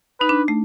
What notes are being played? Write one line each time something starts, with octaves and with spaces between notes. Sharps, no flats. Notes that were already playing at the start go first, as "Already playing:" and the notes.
D#4 B4
D4
A3